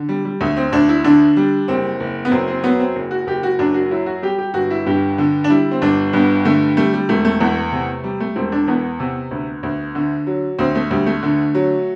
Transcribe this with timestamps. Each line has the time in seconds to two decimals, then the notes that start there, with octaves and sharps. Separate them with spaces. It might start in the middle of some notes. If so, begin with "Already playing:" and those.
Already playing: D3
0.09 G3
0.25 G3
0.41 D2 A3
0.57 C4
0.72 D2 D4
0.89 E4
1.04 D3 D4
1.37 G3
1.68 F#1 C4
2.00 F#1
2.25 B3
2.31 F#2 C4
2.48 C4
2.63 F#3 B3
2.79 C4
2.96 F#1
3.11 F#4
3.27 F#1 G4
3.43 F#4
3.59 F#2 D4
3.74 F#4
3.91 F#3 E4
4.06 F#4
4.22 G3 G4
4.39 G4
4.54 G1 F#4
4.70 E4
4.86 G2 G4
5.18 D3
5.44 D4
5.50 G3 E4
5.71 C4
5.82 G1 D4
6.13 G2 B3
6.45 D3 A3
6.77 G3 A3
6.93 G3
7.09 E1 A3
7.25 A3
7.40 E2 A3
7.72 C3
8.04 G3
8.20 A3
8.36 E1 C4
8.52 D4
8.68 E2 B3
9.00 C3
9.31 D2
9.63 D2
9.95 D3
10.27 F#3
10.59 D2 C4
10.75 A3
10.90 D2 G3
11.06 A3
11.23 D3
11.55 F#3